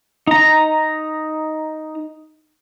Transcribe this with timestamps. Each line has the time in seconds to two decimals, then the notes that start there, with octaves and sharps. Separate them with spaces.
0.27 D#4 A#5